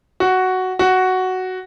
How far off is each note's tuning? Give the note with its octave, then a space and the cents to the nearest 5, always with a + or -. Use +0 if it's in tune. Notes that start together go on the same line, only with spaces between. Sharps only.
F#4 +5
F#4 +5